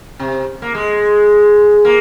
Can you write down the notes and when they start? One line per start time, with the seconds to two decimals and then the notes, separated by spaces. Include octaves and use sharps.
0.19 C3
0.62 A#3
0.75 G#3
1.85 A#3